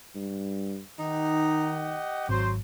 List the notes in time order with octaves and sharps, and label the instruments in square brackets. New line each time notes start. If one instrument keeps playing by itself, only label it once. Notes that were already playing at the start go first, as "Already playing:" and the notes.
[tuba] G2
[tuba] D#3 [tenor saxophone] D#4 [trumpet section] G4 D#5 F#5
[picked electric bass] G#1 [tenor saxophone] F#3 [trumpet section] C5